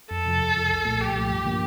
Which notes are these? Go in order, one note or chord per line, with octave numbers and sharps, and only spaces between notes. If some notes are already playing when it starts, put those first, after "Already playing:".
F2 A4
C3 F3
F2
C3 F3
C2
A#2 F3 A3
C2 G4
A#2 F3 A3
G2
D3 F3 A#3